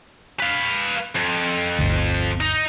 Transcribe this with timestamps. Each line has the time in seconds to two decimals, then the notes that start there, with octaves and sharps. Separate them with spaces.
0.40 B4 F5
1.16 F2
1.79 G1 D2
2.41 D#4